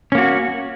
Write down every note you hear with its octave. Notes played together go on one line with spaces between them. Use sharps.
A#3 C#4 F#4